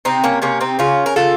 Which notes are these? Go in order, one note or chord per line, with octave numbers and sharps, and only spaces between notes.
C3 C4 D#4
A#3 C#4
C3 A#3 C#4
C4 D#4
C#3 C#4 F4
A#4
C#3 F4 A4